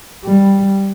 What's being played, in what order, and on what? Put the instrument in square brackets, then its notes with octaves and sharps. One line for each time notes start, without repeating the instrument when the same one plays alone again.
[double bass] G3